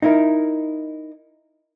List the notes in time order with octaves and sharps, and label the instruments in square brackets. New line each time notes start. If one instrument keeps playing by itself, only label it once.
[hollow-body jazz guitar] D#4 E4 A#4